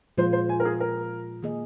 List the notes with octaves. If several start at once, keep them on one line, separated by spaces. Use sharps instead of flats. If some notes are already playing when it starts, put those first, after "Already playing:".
A#2 F3 G#3 F4 C5
C5
G#5
A#4
G#4
A#4
D#3 A#3 G#4 D#5